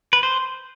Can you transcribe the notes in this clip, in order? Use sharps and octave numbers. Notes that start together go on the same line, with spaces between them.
B4
C5